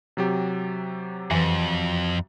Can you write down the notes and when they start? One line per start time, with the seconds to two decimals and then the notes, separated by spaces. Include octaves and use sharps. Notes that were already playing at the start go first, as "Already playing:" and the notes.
0.17 C3 F#3 G4
1.31 F2 E3